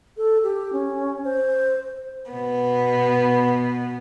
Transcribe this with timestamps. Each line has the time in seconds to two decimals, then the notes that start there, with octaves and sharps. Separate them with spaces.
0.17 A4
0.44 G4
0.73 C#4
1.25 C5
2.30 B2 B3